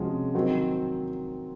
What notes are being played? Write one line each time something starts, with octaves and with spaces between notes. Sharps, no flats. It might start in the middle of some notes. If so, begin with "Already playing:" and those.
Already playing: C3 F3 G#3 C#4 F#4
D#3 F#3 C4 F#4